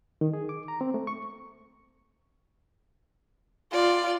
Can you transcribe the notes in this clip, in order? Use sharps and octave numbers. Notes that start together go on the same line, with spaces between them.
D#3
G#4
D6
A#5
C4
A3
C#6
F4 D5